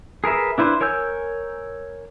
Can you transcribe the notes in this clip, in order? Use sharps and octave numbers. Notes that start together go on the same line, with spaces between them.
G#4 A#4 B4 E5
D4 E4 B4 C5
A#4 C#5 G#5 E6 G6